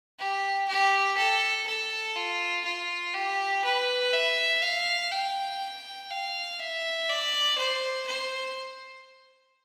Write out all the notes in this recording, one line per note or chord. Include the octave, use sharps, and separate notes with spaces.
G4
G4
A4
A4
F4
F4
G4
B4
E5
F5
G5
F5
E5
D5
C5
C5